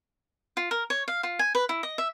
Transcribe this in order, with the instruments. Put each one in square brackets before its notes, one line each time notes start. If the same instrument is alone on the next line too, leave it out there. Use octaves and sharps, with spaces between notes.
[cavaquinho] F4
A#4
C#5
F5
F4
G#5
B4
E4
D#5
E5